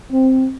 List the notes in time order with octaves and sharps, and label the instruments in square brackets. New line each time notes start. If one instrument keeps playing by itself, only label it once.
[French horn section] C4